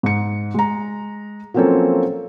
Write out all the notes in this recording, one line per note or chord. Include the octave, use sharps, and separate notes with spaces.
G#2 C#7
G#3 A#5
F3 F#3 A#3 C4 C#4 A4